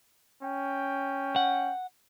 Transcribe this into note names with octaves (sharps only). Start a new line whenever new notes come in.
C#4 G5
F#5